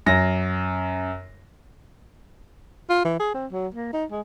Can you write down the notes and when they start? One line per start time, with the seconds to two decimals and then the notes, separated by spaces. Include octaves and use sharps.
0.06 F#2 A#6
2.90 F4
3.05 E3
3.19 G#4
3.34 C4
3.52 F#3
3.74 A#3
3.93 D#4
4.11 G#3